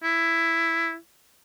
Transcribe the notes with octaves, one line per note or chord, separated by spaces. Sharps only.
E4